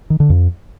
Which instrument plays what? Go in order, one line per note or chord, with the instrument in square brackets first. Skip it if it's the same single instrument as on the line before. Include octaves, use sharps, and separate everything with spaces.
[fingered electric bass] D#3
D3
F2